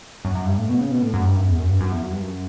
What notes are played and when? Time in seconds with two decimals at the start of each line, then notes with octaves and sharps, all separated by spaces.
0.25 F#2
0.35 F#2
0.46 G2
0.58 A2
0.69 B2
0.80 C#3
0.92 B2
1.02 A2
1.14 F#2
1.25 G2
1.36 F#2
1.47 E2
1.59 F#2
1.70 G2
1.81 F#2
1.92 E2
2.03 F#2
2.13 G2
2.22 F#2